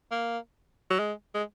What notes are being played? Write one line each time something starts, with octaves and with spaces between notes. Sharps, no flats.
A#3
F#3
G#3
G#3